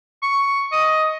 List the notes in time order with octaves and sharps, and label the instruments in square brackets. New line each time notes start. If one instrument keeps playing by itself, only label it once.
[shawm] C#6
D#5